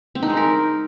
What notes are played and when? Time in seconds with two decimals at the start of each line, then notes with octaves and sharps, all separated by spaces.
0.15 C4
0.23 D#4
0.30 G#3
0.37 A#4